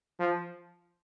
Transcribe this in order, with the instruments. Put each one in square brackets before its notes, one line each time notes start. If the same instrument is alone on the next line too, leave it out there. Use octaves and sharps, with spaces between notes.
[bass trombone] F3